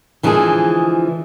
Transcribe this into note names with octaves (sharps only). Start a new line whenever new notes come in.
D3 E3 F3 G#3 D#4 G#4